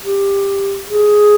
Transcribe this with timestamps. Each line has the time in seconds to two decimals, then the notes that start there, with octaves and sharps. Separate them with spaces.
0.03 G4
0.89 G#4